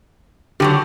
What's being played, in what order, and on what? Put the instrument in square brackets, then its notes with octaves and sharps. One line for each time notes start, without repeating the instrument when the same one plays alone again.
[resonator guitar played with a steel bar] D3 F3 F#3 [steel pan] G4